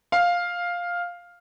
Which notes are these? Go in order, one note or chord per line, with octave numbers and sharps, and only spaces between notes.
F5